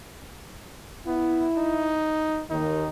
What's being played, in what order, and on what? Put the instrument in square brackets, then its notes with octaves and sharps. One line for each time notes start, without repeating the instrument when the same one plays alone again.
[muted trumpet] B3 [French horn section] E4
[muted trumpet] D#4
[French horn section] D#2 D#3 [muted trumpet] D#4